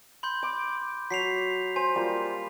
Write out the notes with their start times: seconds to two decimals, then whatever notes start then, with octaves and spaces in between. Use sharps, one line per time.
0.23 B5 C6 G6
0.43 D6
1.10 F#3 B6 C7 F7
1.76 C5 G#5
1.95 G3 A#3 F4